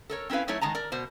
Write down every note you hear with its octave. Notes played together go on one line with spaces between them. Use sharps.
A4 A#4 C#5
C4 C#4 E4 B4 F5
F#3 A3 D#4 E4 C#5
D#3 G#3 A5 A#5
A#4 D5
B2 C5